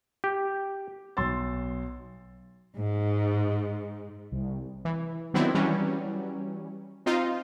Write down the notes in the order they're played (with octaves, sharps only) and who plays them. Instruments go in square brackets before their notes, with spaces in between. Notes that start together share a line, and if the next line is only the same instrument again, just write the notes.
[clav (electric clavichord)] G4
[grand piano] B1 C6 E6 A6
[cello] G#2
[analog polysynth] C2
[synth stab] E3
D#3 F#3 B3 C4 D4 E4
E3 F#3 G3 C#4
C4 D#4 F4